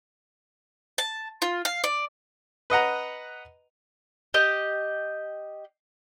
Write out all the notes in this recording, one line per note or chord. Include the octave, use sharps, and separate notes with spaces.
A5
F4
F5
D5
B4 D#5 F#5 A#5
G4 D#5